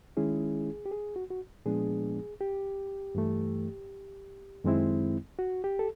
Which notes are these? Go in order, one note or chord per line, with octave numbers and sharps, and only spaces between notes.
D#3 G#3 C#4 E4 G#4
G4
G#4
F#4
F#4
A#2 F3 G#3 B3 D4 G#4
G4
G2 E3 A3
F#2 D#3 G#3 C4 E4
F#4
G4
A4